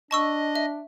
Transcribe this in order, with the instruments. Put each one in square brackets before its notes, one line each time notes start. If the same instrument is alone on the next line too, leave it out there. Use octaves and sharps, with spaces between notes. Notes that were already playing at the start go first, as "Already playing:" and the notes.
[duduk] D4 [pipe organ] D#5 [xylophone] A5 C#6 E6
[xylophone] E5